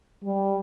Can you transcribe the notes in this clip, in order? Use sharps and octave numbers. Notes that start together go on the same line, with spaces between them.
G3